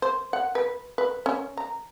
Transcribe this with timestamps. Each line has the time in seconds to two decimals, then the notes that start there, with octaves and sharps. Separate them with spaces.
0.02 C5
0.33 F#5
0.55 B4
0.98 B4
1.26 C#4
1.57 A#5